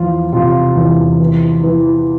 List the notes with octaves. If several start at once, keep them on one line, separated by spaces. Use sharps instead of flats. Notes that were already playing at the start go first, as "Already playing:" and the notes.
Already playing: E2 F3 F4
C3 F4
E2
E3
E3